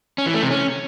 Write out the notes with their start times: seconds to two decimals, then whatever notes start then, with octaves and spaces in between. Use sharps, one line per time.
0.18 C#4
0.26 E3
0.34 A3
0.42 C3
0.51 C#4